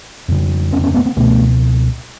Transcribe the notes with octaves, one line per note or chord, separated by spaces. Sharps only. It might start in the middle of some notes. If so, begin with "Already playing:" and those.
F2 C#3
B3 C#4
B3 C#4
A3 B3
A#3 C4
C#2 B2 A3 B3